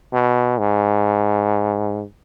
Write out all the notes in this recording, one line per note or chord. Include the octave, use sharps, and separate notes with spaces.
B2
G#2